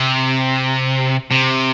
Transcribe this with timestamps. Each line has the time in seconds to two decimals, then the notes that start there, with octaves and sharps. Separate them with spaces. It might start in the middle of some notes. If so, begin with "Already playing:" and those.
Already playing: C3
1.31 C3